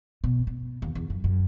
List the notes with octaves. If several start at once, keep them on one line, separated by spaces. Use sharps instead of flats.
B2
B2
D#2
E2
F#2
F#2